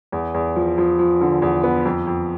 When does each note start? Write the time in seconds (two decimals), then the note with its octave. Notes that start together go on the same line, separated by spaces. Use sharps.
0.12 E2
0.34 E2
0.56 F3
0.78 F3
0.99 F3
1.21 D3
1.42 E2
1.63 B3
1.85 F2
2.07 F2